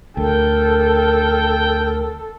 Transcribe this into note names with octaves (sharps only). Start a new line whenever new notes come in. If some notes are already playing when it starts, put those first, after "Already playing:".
D2 A4 A#4 G5